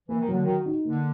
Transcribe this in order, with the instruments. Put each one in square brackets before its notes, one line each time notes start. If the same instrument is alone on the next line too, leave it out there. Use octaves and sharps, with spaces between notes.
[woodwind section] E3 [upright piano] A#3
[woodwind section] D#3
[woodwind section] D3 [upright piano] F#3
[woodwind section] D#3 [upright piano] F#4
[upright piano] D#4
[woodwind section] D3 [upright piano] A#3